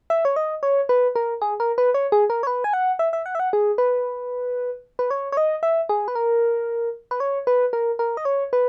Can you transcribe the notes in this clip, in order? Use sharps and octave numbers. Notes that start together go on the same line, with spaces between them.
E5
C#5
D#5
C#5
B4
A#4
G#4
A#4
B4
C#5
G#4
A#4
C#5
B4
G#5
F#5
E5
E5
F#5
E5
F#5
G#4
B4
B4
C#5
C#5
D#5
E5
G#4
B4
A#4
B4
C#5
B4
A#4
A#4
D#5
C#5
B4